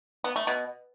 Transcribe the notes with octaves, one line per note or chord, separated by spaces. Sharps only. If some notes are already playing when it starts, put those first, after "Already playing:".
B3
A3
B2